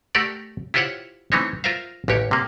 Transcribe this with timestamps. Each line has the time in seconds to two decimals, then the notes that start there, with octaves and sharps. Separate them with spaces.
0.15 A3 G4 A4 A#4 D5 F#5
0.74 E4 F4 G4 C5 C#5 F#5
1.32 E3 A3 C4 C#4 D#4 C#5
1.64 F4 A#4 C5 E5 F5
2.08 A1 D#2 G4 C#5
2.31 C3 A#3